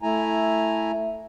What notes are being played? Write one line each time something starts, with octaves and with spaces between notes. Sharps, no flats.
A3 E4 G#5 A#5